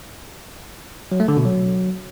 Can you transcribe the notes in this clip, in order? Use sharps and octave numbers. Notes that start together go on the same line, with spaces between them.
F#3
A3
D3
B2
F#3